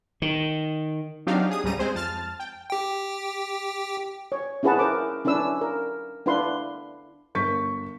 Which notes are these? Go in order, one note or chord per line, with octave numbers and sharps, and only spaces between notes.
D#3
F#3 C4 D4 D#4 G4 F5
G#4 D#6
C#2 G#2 C#3 G3 A#5 D#7
G#3 C4 G#4 C5
F2 A5 F6 A6
G5
G4 G5
C#5
C#4 E4 G#4 B4 F#5 A5
E4 A#4 C5 D6
C#4 D4 E4 B4 E6
A#4
D4 E4 B4 F5 C6
G1 A#4 C#6 G6 B6